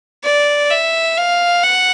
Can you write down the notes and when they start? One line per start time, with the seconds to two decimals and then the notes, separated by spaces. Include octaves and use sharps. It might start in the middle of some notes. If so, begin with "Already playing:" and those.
0.24 D5
0.70 E5
1.17 F5
1.63 F#5